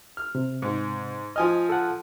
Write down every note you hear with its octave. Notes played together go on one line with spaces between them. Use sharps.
F6
C3
G#2
F3 D#5 G#5 F6
A4 F#5